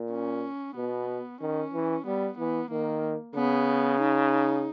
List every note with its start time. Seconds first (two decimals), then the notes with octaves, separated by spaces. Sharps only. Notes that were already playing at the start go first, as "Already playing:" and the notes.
Already playing: A#2
0.12 C#4
0.76 B2 B3
1.41 D#3 C#4
1.74 E3
2.06 G3 B3
2.38 E3 B3
2.70 D#3 A#3
3.35 C#3 B3
4.01 D#4